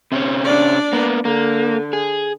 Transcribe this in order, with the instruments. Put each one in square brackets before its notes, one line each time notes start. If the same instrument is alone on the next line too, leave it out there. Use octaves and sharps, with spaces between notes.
[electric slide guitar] C3 C4 C#4
[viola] D4 D5
[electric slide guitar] A#3 B3
[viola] D3 [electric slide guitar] A#3
[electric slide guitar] G#4